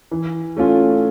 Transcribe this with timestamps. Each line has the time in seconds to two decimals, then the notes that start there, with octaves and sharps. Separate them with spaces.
0.11 E3
0.57 A3 C#4 F4